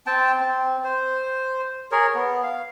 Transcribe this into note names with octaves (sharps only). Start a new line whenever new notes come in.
C4 G5 A5
C4
C5
G#4 A#4 C#5
B3
F5